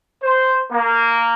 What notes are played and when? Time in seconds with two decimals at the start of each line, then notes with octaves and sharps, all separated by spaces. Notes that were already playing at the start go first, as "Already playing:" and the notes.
0.22 C5
0.71 A#3